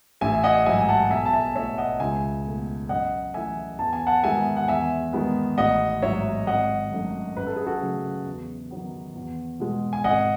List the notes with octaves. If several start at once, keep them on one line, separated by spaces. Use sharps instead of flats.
A1 E5 G#5
E5
D#5 F#5
G#2 F#3 E5 G#5
G#5
F#5 A5
B1 E5 G#5
A5
E5 G#5
B2 A3 C#5 E5
D#5 F#5
C#2 E5 G#5
B2 A3
F#2 D#5 F#5
E3 A3 E5 G#5
E2 A5
G#5
F#5 A5
D#3 G#3 B3 E5 G#5
F#5
E2 E5 G#5
D#3 G#3 B3
A1 D#5 F#5
G#2 F#3 C#5 E5
G#1 D#5 F#5
F#2 D#3 F#3 A3
F#2 B4
A4
G#4
F#4 A4
C#3 F#3 A3
E2
D#3 F#3 B3
E2
B2 G#3
G#5
G#1 D#5 F#5